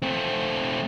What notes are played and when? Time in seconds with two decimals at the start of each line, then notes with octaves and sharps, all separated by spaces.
0.02 A3 C4